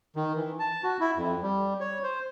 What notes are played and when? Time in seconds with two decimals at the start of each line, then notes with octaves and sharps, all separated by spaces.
0.16 D#3
0.36 E3
0.59 A5
0.84 F#4
1.00 E4
1.17 F2
1.43 G3
1.80 C#5
2.03 C5